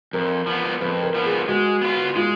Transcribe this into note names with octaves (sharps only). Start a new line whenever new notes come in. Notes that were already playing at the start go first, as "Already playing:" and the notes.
F2 A#4
F3 B3
F2 B4
A#4
F3 B3
G#4
G#3 F#4
B3 F4
G#3 F4